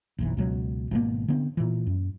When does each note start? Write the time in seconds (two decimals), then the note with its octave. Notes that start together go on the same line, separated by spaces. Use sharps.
0.18 F#1 B1 E3
0.37 C#2 B2 F#3
0.91 G#1 B2 A#3
1.28 D3 B3 C4
1.57 A#2 E3
1.87 F#2